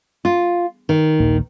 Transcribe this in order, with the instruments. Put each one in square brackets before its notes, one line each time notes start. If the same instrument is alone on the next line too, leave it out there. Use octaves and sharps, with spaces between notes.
[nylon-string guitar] F4
D#3
[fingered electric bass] A#1 D#2 A#2